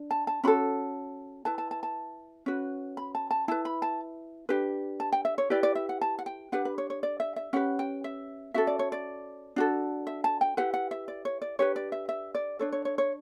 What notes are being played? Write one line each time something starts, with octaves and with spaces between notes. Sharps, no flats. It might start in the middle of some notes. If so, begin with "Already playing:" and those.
Already playing: D4
A5
A5
C#4 F#4 A4 B5
E4 B4 A5
A5
A5
A5
C#4 F#4 B4
B5
A5
A5
E4 B4 A5
B5
A5
D4 G4 B4
A5
G5
E5
C#5
E4 G4 B4 D5
D5
E5
F#5
A5
F#5
G5
D4 G4 B4 F#5
B4
C#5
C#5
D5
E5
E5
C#4 G4 B4 F#5
G5
E5
C#4 F#4 A4 E5
D5
C#5
D5
D4 F#4 A4
E5
A5
G5
E4 G4 B4 F#5
F#5
E5
D5
C#5
D5
D4 G4 B4 C#5
D5
E5
E5
D5
D4 A4 C#5
C#5
C#5
C#5